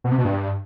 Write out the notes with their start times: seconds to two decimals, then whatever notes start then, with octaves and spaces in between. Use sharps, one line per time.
0.04 B2
0.11 C3
0.18 B2
0.25 G2